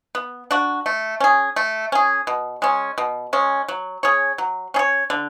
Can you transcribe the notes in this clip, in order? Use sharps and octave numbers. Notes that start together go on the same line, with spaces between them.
B3
D4 F#4
A3
C#4 G#4
A3
C#4 G#4
B2
G#3 C#4
B2
G#3 C#4
F#3
C#4 G#4 C#5
F#3
C#4 G#4 C#5
D3